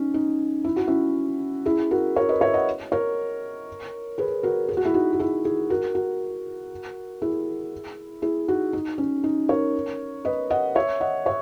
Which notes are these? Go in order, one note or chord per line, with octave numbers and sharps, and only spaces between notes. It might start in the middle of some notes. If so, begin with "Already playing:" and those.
Already playing: C#4 D#4
D#4
E4
F#4
C#4 E4
E4 G#4
F#4 A#4
A#4 C#5
B4 D#5
C#5 E5
D#5 F#5
A#4 C#5
G#4 B4
F#4 A#4
G#4
F#4
E4 G#4
D#4 F#4
F#4
E4 G#4
E4 G#4
F#4 A#4
F#4 A#4
E4 G#4
E4 G#4
D#4 F#4
D#4
C#4
D#4
A#4 C#5
B4 D#5
D#5 F#5
C#5 E5
D#5 F#5
C#5 E5